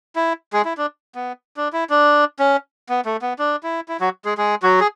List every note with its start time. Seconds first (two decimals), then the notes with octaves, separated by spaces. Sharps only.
0.16 E4
0.53 G#3 G#4
0.65 E4
0.78 D4
1.15 B3
1.57 D4
1.73 E4
1.90 D4
2.39 C#4
2.89 B3
3.05 A3
3.22 B3
3.39 D4
3.63 E4
3.88 E4
4.00 F#3 F#4
4.25 G#3 G#4
4.38 G#3 G#4
4.63 F#3 F#4
4.80 G#4